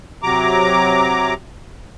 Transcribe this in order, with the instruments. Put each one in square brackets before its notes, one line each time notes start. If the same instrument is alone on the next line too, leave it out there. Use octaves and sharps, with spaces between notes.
[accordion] C3 F#3 A#5 D6